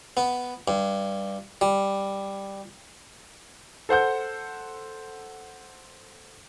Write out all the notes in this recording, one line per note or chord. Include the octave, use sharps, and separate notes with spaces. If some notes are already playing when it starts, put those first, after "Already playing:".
B3
G2
G3
A4 C5 F#5 G6